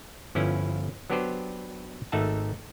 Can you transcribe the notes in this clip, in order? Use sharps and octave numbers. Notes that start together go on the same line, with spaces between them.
G1 F3 C#4 E4 B4
F#3 B3 D4 G4 B4 C5
G#1 A3 D#4 E5 F#5 A5